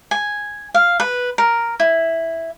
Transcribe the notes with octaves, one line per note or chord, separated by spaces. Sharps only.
G#5
F5
B4
A#4
E4